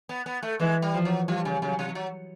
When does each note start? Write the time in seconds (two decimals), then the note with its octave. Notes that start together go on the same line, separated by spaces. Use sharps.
0.09 B3
0.26 B3
0.43 A3
0.60 E3 G#3
0.82 G3
0.94 F3
1.05 F#3
1.28 F3 G3
1.45 C#3
1.62 C#3 F#3
1.79 C3
1.95 F#3